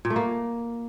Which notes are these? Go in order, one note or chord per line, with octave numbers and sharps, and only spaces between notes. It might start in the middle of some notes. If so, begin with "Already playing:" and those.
A#2
A3
A#3